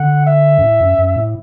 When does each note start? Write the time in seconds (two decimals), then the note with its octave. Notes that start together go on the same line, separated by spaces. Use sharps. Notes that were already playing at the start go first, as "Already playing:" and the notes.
Already playing: D3 F#5
0.27 E5
0.58 F#2
0.63 A2
0.81 F#2
0.98 F#2
1.16 A2